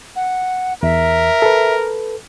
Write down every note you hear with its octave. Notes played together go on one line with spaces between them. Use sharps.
F#5
E2 A#4 E5
A4 B4